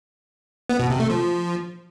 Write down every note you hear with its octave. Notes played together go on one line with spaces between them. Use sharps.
B3
B2
C3
A3
F3